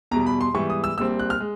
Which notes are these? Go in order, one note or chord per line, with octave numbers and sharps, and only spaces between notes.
E2 B2 G3 A#5
B5
C6
G#2 E3 G3 B3 C#6
D#6
E6
A#1 A#2 G3 C4 E6
F#6
F6
G#3